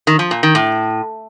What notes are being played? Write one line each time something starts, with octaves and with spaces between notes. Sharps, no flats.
D#3
F3
A#2
D#3
A2